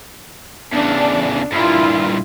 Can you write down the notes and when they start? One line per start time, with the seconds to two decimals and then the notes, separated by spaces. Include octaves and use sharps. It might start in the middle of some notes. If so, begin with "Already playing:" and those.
0.73 E2 C#3 D4
1.52 G2 A#2 E4 F4